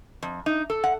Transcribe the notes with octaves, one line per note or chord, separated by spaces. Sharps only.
F2
D#4
A4
F#5